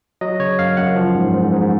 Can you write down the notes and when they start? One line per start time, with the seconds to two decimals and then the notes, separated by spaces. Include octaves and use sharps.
0.21 F#3 D#5
0.40 C#3 C#5
0.59 F#2 F5
0.77 F#2 F#5
0.96 F3
1.15 G#2
1.34 G#2
1.52 G#2